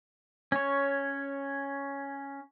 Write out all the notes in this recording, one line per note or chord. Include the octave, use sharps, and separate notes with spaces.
C#4 C#5